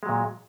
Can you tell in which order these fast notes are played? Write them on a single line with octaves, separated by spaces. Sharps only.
G#3 F#3 A#2